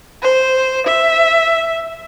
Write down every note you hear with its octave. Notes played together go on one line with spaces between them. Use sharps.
C5
E5